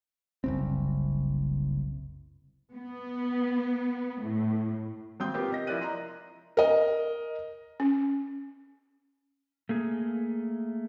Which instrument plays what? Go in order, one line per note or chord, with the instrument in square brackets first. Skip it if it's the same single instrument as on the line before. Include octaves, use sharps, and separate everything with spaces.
[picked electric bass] F#1 C2 C4
[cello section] B3
A2
[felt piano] G#1 C4 G5 C6 D#6 G6
C4 F4 G4 A#4 B4
C3 D#5 A#6
F3 E4 A#4 D5 F#6 D#7
D#5 A#5 C6
A#4 D#5
[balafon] C#4
[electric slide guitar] A3 A#3 G#4